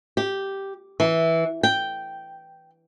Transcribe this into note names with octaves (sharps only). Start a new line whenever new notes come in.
G4
E3
G5